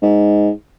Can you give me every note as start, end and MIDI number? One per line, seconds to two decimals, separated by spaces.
0.02 0.50 44